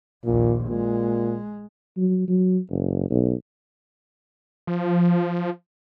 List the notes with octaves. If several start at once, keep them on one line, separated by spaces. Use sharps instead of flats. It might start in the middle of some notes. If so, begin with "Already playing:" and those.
A#1 D#2 A#2
A#2 G#3
F#3
F#3
F#1
B1
F3